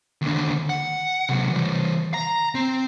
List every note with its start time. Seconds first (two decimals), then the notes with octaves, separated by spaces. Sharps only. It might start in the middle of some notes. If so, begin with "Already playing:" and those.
0.22 D#2 D3
0.70 F#5
1.29 C3 F#3
1.51 E3 G3
2.14 A#5
2.55 C4